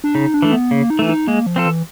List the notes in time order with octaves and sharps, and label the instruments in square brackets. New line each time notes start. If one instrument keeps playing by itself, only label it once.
[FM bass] D4
[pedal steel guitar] C#3 [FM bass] D#4
[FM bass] D4
[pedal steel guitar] E3 A3
[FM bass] B3
[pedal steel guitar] C#3 [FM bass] A#3
[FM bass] D#4
[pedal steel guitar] E3 A3
[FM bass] D#4
[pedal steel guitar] G#3 [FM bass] A#3
[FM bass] F3
[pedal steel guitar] C4 F4 A4
[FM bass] E3